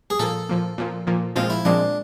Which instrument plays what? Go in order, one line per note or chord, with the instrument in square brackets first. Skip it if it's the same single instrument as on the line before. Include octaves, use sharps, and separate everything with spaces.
[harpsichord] G#4
[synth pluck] A#2 F3 A#3 [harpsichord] A4
[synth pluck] A#2 F3 A#3
A#2 F3 A#3
A#2 F3 A#3
[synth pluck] A#2 F3 G#3 C4 [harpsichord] F4
[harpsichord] E4
[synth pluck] A#2 F3 G#3 C4 [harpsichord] D4